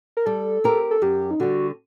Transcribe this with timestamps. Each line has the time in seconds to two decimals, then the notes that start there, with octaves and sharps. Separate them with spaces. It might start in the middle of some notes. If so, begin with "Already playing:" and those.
0.17 A#4
0.26 G3 A4
0.64 C4 G4 A#4
0.91 A4
1.02 F#2 G4
1.31 D#4
1.40 D3 G3 F#4